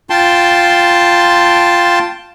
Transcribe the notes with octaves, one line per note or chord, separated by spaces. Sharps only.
F4 G5 A5 C6